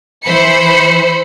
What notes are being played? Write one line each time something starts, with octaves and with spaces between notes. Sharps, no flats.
E3 C5 B5 C#7